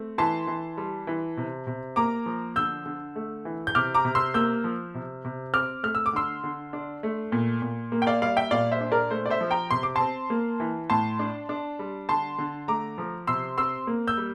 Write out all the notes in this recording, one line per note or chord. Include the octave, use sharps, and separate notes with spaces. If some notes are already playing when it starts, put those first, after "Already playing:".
Already playing: A3 C4
E3 A5 C6
E3
G3
E3
C3
C3
A#3 A#5 D6
F3
D3 E6 G6
D3
A3
E3
G6
C3 D6 F6
A#5 D6
C3
C6 E6
A#3 E6 G6
F3
C3
C3
C4 D6 F6
A3 F6
E6
D6
D3 C6 E6
D3
D4
A3
A#2
A#2
A#3
G5
D5 F5
G3 D5 F5
E5 G5
A#2 D5 F5
C5 E5
D4
A#4 D5
A3 C5
D5
C5 E5
F3
G5 A#5
C3 C6
D6
C4 A5 C6
A#3
E3
A2 A5 C6
D4
D4
G3
D3 A5 C6
D3
A3 A#5 D6
F3
C3 C6 E6
C4 C6 E6
A#3
E6 G6
G3